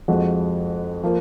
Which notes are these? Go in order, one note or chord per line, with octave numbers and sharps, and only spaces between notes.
F2 F3 G#3 F#4
F3 A#3